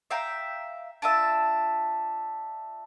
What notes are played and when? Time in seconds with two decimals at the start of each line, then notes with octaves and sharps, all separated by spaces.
0.11 E5 F5 G5 A#5
1.02 D4 F4 E5